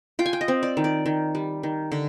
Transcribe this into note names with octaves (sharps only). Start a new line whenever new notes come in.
F4 G5
G#5
G5
D#5
C4
D5
D#3
D5
D#3
G3
D#3
D3